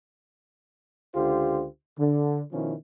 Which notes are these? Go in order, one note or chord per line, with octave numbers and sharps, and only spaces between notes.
C#2 D3 F4 G4 C5
D3
B2 D#3 F3 C#4 E4